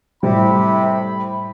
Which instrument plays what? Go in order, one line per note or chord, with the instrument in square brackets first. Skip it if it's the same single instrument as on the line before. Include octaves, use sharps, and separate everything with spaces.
[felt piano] A2 G3 [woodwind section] C3 [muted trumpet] B5